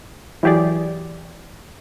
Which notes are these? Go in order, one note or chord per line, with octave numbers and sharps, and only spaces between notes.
E3 F#3 G4 G#4 D5